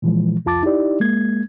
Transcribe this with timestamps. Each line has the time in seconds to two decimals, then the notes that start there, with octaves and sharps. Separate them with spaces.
0.02 A#2 E3 F3 G#3
0.45 C2 F2 F4 A5 D6 A6
0.63 D#4 E4 G4 D5
1.00 G#3 A#3 G#6